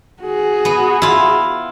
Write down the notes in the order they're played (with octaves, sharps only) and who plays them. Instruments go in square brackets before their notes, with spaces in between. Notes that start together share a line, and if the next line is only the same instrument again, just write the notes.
[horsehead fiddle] F#4 G#4
[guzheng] B3
E4 F4